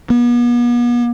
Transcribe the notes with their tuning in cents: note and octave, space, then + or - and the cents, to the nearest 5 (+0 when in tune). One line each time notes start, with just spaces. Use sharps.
B3 -40